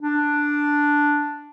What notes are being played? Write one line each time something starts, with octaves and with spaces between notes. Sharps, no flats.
D4